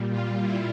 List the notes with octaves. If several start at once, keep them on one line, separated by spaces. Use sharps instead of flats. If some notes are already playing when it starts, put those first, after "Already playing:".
Already playing: A#2 G3
F4
E4